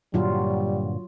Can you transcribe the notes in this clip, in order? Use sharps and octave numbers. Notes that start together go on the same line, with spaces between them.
G2 A#2 D3 F#3 G3 F4